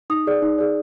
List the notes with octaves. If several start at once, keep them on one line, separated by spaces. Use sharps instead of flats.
D#4 D#6
G#4 D5
D#4
G#4 D5